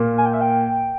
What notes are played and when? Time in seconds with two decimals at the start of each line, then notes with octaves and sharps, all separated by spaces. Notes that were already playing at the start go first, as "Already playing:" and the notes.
Already playing: A#2 A#3
0.18 G#5
0.26 G5
0.34 E5
0.41 G5